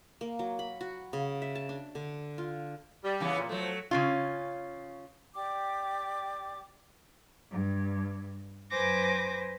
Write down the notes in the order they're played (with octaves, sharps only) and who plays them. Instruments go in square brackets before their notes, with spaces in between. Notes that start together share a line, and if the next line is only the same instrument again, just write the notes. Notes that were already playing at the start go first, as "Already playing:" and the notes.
[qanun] A#3
F#3
B5
F#4
C#3
E5
A5
D4
D3
F4
[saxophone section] G3
[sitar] C#3 E3 B3
[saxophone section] A#2
[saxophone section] F3 [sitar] F#3 A3
[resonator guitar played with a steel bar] C#3 C#4 F4
[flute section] G4 D5 G5 D6
[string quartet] G2
F#2 B4 C5 G#5 D6 A#6